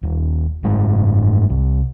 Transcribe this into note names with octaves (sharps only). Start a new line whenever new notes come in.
D#1
F#1 G#2 G#3
C2